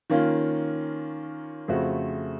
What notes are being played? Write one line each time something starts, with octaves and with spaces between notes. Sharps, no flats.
D#3 A#3 C#4 F4
F2 C#3 A3 C4 F#4